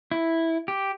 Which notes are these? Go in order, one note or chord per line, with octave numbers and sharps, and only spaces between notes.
E4
G4